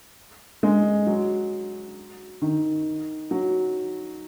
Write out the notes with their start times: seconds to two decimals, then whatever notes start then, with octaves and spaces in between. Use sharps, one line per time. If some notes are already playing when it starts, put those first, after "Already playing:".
0.63 G#3
1.07 F#3
2.42 D#3
3.31 F#3